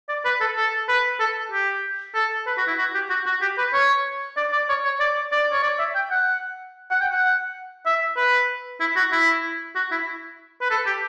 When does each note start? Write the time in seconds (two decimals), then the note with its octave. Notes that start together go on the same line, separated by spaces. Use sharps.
0.09 D5
0.25 B4
0.41 A4
0.57 A4
0.88 B4
1.20 A4
1.52 G4
2.15 A4
2.46 B4
2.57 F#4
2.68 E4
2.78 F#4
2.94 G4
3.10 F#4
3.26 F#4
3.42 G4
3.58 B4
3.73 C#5
4.37 D5
4.52 D5
4.69 C#5
4.84 C#5
5.00 D5
5.32 D5
5.52 C#5
5.63 D5
5.79 E5
5.95 G5
6.11 F#5
6.91 F#5
7.01 G5
7.12 F#5
7.86 E5
8.16 B4
8.80 E4
8.96 F#4
9.12 E4
9.75 F#4
9.91 E4
10.61 B4
10.70 A4
10.86 G4